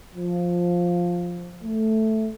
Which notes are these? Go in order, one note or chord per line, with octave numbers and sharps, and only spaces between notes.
F3
A3